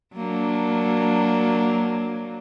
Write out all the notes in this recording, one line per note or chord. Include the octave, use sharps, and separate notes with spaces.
F#3 A#3 D4